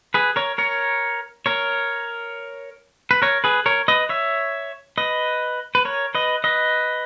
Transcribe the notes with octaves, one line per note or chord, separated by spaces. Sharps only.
G#4 B4
A#4 C#5
A#4 C#5
A#4 C#5
B4
A#4 C#5
G#4 B4
A#4 C#5
B4 D#5
C#5 E5
B4 D#5
B4
A#4 C#5
B4 D#5
B4 D#5